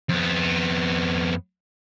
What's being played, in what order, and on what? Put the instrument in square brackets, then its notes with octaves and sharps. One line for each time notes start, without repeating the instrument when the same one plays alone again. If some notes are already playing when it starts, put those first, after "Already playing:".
[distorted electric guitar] F2 B3